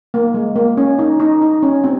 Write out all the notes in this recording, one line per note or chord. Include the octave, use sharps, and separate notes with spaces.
A#3
G#3
A#3
C#4
D#4
D#4
D#4
C#4
C4